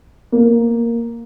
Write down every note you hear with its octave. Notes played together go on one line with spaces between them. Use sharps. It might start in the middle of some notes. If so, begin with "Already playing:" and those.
A#3